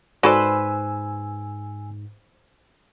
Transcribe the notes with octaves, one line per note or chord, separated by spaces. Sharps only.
G#2 F#4 A4 B4 C5 D5 G#5 E6